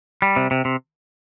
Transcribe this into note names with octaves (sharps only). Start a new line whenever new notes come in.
G3
C3
C3
C3